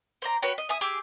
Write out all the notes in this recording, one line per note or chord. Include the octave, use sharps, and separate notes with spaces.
C5 D5 A#5
F#4 B4 C#5 G5
D#5
E5 G#5 D#6
G4 G#4 D6 E6